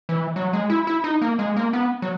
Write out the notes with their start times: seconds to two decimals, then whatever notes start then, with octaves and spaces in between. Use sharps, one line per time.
0.09 E3
0.36 F#3
0.53 G#3
0.70 E4
0.87 E4
1.04 D#4
1.21 A#3
1.39 G#3
1.56 A#3
1.73 B3
2.02 F#3